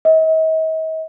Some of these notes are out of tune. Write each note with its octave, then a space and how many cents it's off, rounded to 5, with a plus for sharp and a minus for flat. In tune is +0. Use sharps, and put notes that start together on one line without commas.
D#5 +45